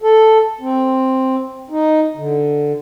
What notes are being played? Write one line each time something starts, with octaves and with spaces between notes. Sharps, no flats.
A4
C4
D#4
D3